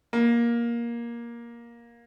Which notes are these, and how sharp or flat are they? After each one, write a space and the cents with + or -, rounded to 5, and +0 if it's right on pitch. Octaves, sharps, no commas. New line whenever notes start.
A#3 +15